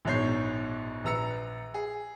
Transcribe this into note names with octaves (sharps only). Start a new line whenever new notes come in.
A#1 G#2 B2 C#5 G6 C7
A#1 B4 A#5 E6 C#7
G#4